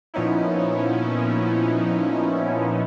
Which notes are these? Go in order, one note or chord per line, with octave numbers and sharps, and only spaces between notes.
A#2 F3 B3 C#4 D#4 E4